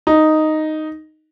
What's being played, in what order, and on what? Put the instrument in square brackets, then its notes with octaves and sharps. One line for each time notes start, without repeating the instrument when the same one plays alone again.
[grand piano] D#4